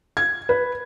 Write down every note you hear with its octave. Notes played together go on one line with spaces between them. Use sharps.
G#6
B4